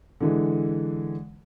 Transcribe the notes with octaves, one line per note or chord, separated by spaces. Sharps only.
D3 E3 G#3